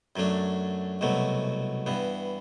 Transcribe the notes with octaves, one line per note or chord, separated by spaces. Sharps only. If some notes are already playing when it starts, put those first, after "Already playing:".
F#2 F#3 A3 D4
C2 B2 F#3 A3
G2 E3 B3